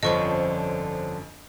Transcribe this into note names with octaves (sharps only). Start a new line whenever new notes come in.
G1 F2 D3 F3 C#4 D#5 C#6